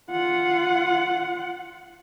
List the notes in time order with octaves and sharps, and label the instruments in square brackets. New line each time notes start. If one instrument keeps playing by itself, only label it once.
[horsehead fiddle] F4 F#5